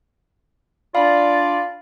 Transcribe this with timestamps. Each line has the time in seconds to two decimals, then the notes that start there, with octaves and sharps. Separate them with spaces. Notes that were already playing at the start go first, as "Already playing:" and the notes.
0.95 D4 F4 D5 F5 B5